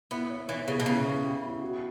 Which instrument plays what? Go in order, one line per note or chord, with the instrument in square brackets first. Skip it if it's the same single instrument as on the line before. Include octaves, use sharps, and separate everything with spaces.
[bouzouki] B3 [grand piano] E4
[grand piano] C#5
[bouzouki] E3 [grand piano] C#5
[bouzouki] C#3 [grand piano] B3
[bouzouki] B2
[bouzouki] C#3 [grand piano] E4
[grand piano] E4
G4
E4
F#4